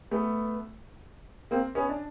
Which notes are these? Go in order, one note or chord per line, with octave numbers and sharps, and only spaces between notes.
A3 B3
A#3 C4
B3 C#4
D4